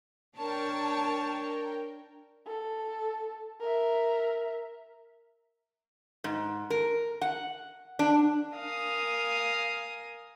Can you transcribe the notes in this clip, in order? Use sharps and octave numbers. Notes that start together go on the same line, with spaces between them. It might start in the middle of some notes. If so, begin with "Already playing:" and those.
D4 A#4 C#5 G5 A5
A4
A#4 E5
G#2
A#4
F#5
D4
A#4 F5 G#5 D#6